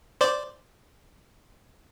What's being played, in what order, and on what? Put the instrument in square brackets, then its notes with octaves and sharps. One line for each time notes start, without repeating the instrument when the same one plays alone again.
[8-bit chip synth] C5 D5